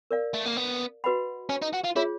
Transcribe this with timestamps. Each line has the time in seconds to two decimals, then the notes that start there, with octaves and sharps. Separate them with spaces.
0.11 A#4 D5 F5
0.34 A3
0.46 A#3
0.57 B3
1.04 F#4 B4 D#5 F#5 B5
1.49 C#4
1.62 D#4
1.73 F#4
1.84 F4
1.96 E4 F4 G#4 C#5